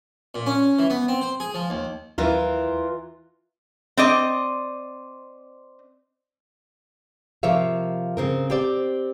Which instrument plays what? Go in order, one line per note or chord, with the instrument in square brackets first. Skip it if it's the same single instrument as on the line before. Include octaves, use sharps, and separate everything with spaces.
[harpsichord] A#2
C#4
E3
B3
C4
C5
G#4
F3
D#2
[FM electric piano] D#2 F#3 E4 [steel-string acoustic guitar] E3 F4 A#4
[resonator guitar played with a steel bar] C4 D5 D#5
[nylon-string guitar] C3 F3 A#4 C#5 E5 F5
C#3 C4 A#4
C4 G4 C5 D5